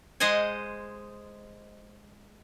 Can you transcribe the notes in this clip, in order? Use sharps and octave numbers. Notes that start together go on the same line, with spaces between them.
G#3 G#4 C5 D#5 F#5 G#5